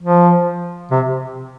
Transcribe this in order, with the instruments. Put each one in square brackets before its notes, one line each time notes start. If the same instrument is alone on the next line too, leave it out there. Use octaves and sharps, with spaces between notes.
[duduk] F3
C3